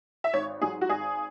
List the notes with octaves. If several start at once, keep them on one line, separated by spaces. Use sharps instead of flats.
E5
G#1 C#5
G#2 F#3 G#4
F#4
G#1 G#4